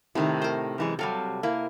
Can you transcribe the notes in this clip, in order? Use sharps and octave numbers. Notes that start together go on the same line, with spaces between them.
A2 C3 D#3 A3
A#4 C5
F#2 E3 G#3
C3 F#3 G3 A4 F5
A#3 E4